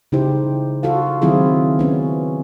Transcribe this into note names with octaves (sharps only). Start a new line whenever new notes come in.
C#3 D#4 E4 G4 C5
F4 F#4 A4 F5
D#3 F#3 C4 E4 F4 G#4
B3 C#4